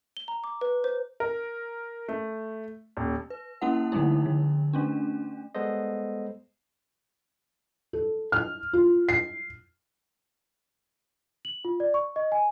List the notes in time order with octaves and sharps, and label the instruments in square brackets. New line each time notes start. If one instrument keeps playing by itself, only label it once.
[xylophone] G7
A#5
D6
B4
C5
[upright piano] A#4
A3
D#1
[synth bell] B4
A#3 C#4 E4 F#5
D3 F3 G3 A3 D#4 E4
D3
A3 C#4 D4
[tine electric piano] G3 G#3 B3 A4 C5 D#5
[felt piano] A4
F6
F4
C7
[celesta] F#7
F4
D5
C#6
D#5
G#5